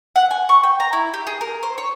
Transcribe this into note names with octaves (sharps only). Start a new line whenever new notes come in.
F#5
G#5
C#6
G5
A#5
E4
G4
G#4
A#4
C5
C#5